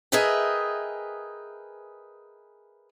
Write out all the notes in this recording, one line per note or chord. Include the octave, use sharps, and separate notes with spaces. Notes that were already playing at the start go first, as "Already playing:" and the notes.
G#4 A#4 B4 D#5 E5 G5